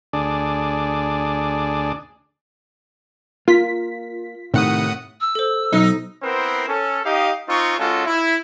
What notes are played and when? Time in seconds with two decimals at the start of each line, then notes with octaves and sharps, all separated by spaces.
0.13 D2 D4 G#4 D5
3.48 A#3 F4 B6
4.54 A2 C3 D#3 F#5 D#6
5.21 E6
5.35 A4 C5
5.73 B1 D#4
6.23 B3 C4 E4 A#4 C5
6.68 C#4 A4
7.04 D#4 G4 D#5 F5
7.49 C4 D#4 F4 C#6
7.78 G#3 C#4 F4 F#4 A4
8.07 E4